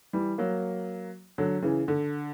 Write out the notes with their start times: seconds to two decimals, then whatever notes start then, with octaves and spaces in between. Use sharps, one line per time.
0.13 E3 G3
0.38 F#3 A#3
1.38 D3 F#3
1.62 C#3 E3
1.88 D3